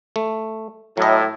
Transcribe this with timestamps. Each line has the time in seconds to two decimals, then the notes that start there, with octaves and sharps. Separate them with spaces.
0.16 A3
0.97 A2 F#3 D#5